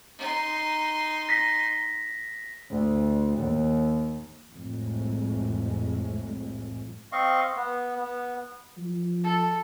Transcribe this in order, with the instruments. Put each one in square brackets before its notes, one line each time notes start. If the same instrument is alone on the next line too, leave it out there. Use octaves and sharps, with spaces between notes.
[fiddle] D#4 C6
[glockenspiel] A#6 B6
[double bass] D2
D#2
[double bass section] C2 F2 A2 G#3
[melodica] C4 D#5 F5 C#6
B3
B3
[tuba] F3
[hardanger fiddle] A4